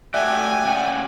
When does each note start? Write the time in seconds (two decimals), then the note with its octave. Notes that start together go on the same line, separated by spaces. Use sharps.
0.14 A3 F#4 G4 D5 E5 G5 G#5 F#6
0.65 C#3 G4 F#5